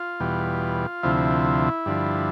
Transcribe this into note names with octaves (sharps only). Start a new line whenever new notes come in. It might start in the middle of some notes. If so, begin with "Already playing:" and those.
Already playing: F4
E2 B2 G3
D2 C3 F3 E4
G2 D3 F3